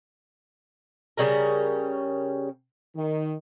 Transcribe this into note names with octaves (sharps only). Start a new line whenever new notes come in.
C#3 G3 C#4 A#4
D#3